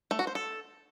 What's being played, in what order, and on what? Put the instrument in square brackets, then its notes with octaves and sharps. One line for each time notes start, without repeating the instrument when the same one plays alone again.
[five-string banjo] A3
F#4
C5
A4